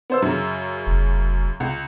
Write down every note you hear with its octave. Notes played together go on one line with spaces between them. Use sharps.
B3 C5 E6
F#2 C#3
F1
C#2